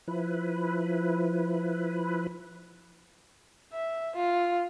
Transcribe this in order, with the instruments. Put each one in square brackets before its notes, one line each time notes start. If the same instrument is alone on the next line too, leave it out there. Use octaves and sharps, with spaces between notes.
[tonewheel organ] F3 E4 B4
[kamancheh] E5
F4